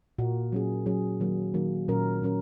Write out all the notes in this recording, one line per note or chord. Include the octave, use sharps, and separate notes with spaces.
A#2 A#3 F#4 A#4
F#3 C#4 G#4
F#3 C#4 G#4
D#3 F#3 A#3
D#3 F#3 A#3
A#2 F#3 C#4 A#4
A#2 F#3 C#4 A#4